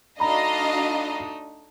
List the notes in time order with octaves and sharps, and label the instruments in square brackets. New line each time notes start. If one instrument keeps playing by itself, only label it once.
[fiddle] A3 D#4 [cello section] D4 F#4 [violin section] D#5 F5 [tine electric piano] A#5 B5